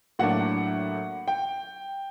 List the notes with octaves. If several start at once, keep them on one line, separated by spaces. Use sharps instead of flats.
A2 F#3 A#3 D4 F#5
G5